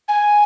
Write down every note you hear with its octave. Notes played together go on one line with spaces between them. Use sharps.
G#5